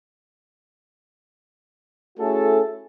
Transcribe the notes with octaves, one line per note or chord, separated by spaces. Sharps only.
A3 C#4 E4 F#4 G#4 A4